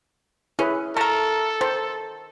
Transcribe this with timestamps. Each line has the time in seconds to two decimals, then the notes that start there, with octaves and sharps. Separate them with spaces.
0.59 C#4 E4 G#4 B4
0.97 A3 A4 A#4 A5 A#5
1.61 D#3 C5